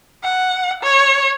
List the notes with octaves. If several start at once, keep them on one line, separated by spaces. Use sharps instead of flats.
F#5
C#5